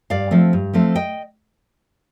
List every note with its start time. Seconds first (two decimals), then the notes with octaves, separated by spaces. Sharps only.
0.10 G2 D5 F5
0.31 F3 A3 C4
0.53 G2
0.73 F3 A3 C4
0.95 D#5 G5